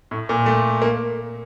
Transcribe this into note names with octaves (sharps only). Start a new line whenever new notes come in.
A2
A#2
A3
A#3